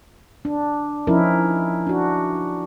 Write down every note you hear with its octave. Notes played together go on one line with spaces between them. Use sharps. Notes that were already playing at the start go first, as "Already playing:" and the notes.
D4
F3 C#4 D#4 E4 A#4
D4 F#4